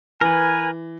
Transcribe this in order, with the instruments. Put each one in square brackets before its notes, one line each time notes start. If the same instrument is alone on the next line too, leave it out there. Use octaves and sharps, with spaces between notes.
[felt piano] E3 [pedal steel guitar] A#4 B4 [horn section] G#5